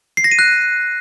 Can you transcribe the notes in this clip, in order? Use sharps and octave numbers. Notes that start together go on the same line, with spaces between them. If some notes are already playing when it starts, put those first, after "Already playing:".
C7
A#6
D#7
F#6